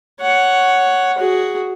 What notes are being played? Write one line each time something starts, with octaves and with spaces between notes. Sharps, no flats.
C#5 F#5
F#4 G#4